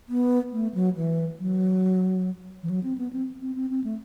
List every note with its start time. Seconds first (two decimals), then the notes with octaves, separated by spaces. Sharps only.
0.09 B3
0.52 A3
0.74 F#3
0.96 E3
1.39 F#3
2.63 E3
2.70 F#3
2.83 C4
2.98 B3
3.13 C4
3.41 C4
3.56 C4
3.70 C4
3.84 A3